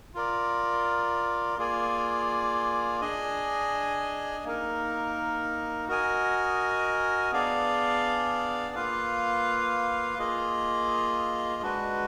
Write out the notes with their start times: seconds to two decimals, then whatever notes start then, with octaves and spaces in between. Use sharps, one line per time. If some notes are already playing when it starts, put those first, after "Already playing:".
0.14 F4 A#4 D5
1.58 A#3 F4 G#4 D5 G#5
3.01 D4 G#4 D#5 G#5
4.44 A#3 D#4 A#4
5.88 F#4 A#4 D#5 G#5
7.32 B3 D4 G#4 D5 F5
8.75 A#3 F4 B4 F5
10.19 A#3 F4 G#4 D#5
11.62 G#3 D4 F#4 B4